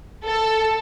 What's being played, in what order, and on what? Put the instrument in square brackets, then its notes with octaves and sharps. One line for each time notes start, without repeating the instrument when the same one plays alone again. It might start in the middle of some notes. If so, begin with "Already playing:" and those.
[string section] A4